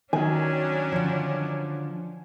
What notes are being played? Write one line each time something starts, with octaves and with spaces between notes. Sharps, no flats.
D#3 F#3 C#4 D4 G#5
D3 F3